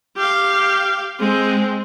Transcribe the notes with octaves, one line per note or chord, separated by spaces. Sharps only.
G4 F5
G#3 C4